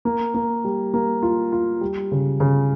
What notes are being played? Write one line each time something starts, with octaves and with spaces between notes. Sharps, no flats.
A#3
A#3
G3
A#3
F4
F4
G3
C#3
C#3